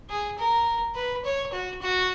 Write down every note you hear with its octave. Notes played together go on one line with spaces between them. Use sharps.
G#4
A#4
B4
C#5
F#4
F#4